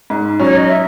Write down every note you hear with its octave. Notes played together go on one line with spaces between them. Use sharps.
G#2
F#3 C#4 C#5
D#5
E5